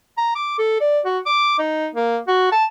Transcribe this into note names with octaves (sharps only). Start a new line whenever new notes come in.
A#5
D6
A4
D5
F#4
D6
D#4
A#3
F#4
A5